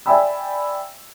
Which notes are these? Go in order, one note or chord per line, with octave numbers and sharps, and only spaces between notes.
D5 E5 G5 G#5 B5 E6